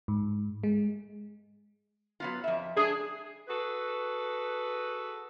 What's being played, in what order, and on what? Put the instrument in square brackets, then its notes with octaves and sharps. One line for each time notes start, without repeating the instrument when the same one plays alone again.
[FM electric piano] G#2
G#3
[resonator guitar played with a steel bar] F#3 B3 F4
F2 E5
[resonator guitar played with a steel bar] D4 [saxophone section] G#4
[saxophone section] F#4 G#4 A4 B4